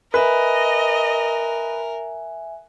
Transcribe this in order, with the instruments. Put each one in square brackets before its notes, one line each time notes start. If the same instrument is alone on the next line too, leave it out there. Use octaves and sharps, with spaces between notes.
[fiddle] A#4 [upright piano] B4 [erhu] D#5 [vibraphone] E5 G#5